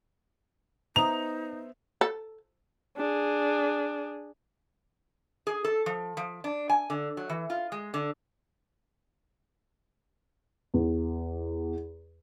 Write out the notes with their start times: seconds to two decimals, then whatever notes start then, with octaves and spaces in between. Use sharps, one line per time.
0.96 B3 D#4 C5 E5 A#5 D#6 F7
2.01 A4
2.97 D4 G#4
5.47 G#4
5.64 A4
5.86 F3
6.17 F3
6.44 D4
6.69 G#5
6.90 D3
7.17 F#3
7.29 E3
7.50 F4
7.72 G#3
7.94 D3
10.74 E2